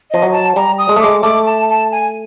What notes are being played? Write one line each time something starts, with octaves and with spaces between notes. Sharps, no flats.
F3 D#5
F#3
A5
G3 A#5
D#6
G#3
A3
G#3 D6
A3 D6
A5
A5
G#5